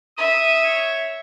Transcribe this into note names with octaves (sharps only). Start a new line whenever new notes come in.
E5 D#6
C#5